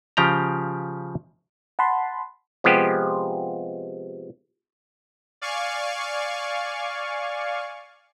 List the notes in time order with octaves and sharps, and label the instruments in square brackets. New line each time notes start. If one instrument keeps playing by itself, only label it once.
[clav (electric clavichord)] C#3 F3 G4 G5 A#5
[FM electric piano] F#5 A5 B5 C6
[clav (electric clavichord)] C3 F3 G#3 B3 G4 C5
[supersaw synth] D5 F5 G#5 C#6